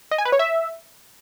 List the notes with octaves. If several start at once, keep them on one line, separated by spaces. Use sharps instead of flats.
D#5
G#5
B4
C#5
E5